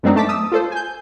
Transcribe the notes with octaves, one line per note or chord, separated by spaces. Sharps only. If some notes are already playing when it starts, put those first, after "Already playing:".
F#2 B2 G#3 C4 D4 D#4
A3 A5 D6 B6
D#6 E6
F4 A4 C5
G#5 G6